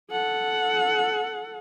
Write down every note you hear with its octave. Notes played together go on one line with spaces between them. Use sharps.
A4 F#5